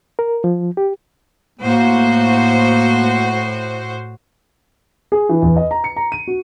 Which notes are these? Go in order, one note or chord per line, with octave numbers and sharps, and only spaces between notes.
A#4
F3
G4
A2 A#3 F#4 C5
G#4
E3
E2
D#5
A#5
C#7
A#5
D#7
F#4